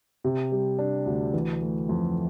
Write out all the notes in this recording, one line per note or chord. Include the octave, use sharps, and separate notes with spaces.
C3
G3
D4
D2
E3
A3
F2